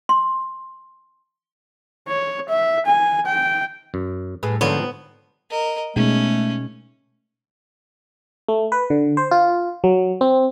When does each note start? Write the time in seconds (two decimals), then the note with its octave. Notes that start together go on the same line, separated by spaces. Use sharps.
0.09 C6
2.09 C#5
2.49 E5
2.87 G#5
3.27 G5
3.94 F#2
4.43 A2 G#4 B4
4.61 G#2 D3 F3 B3 C4 F4 C#5
5.50 A#4 D#5
5.96 B2 G#3 A3 C#4 D#4
8.48 A3
8.72 B4
8.90 D3
9.17 C5
9.31 F4
9.84 F#3
10.21 C4